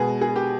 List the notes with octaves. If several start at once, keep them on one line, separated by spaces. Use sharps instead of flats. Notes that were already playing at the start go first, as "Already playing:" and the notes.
Already playing: B2 G#3 B3 G#4
G#4
G4